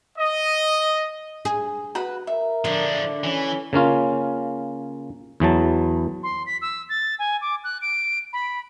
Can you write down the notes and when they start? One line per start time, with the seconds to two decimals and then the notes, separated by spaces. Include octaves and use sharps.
0.18 D#5
1.45 G#4
1.95 F#4 B4 B5
2.27 A#4 E5
2.65 D3 F3 D4
3.24 E3 C#4
3.73 C#3 A#3 C#4 F4
5.40 E2 E3 F#3 A5
6.23 C6
6.46 B6
6.62 E6
6.89 A6
7.19 G#5
7.41 D6
7.64 F#6
7.81 D7
8.33 B5